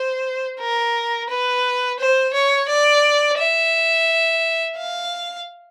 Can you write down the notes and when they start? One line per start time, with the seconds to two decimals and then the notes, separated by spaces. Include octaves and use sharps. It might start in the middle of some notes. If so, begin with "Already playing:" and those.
Already playing: C5
0.60 A#4
1.29 B4
1.99 C5
2.33 C#5
2.69 D5
3.38 E5
4.76 F5